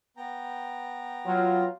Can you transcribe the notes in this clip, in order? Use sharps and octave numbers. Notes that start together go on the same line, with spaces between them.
B3 G5 A#5
F#3 F4